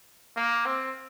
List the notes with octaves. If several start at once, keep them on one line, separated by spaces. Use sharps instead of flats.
A#3
C4